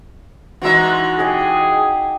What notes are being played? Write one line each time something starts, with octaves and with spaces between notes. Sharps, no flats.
E3 G#3 D#4 F#4 E5
G4 G#4 D#5 G5